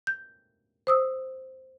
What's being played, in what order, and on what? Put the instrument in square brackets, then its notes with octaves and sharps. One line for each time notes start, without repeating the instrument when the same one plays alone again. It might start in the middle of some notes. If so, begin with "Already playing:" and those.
[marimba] G6
C5 D#6 E6